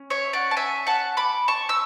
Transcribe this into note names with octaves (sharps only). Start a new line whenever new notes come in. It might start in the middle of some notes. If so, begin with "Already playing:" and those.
Already playing: C#4
C#5 E5
D5 F#5
A5
E5 G#5
F#5 A5
B5 D6
A5 C#6
E6